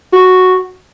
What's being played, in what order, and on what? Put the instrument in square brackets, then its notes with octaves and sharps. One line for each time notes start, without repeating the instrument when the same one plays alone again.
[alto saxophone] F#4